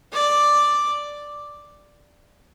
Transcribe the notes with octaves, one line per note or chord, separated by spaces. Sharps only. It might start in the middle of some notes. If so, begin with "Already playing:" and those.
D5